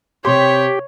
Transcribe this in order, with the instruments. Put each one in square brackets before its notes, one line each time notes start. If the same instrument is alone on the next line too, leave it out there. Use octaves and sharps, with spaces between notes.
[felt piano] C3 C6 [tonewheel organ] G4 [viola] C#5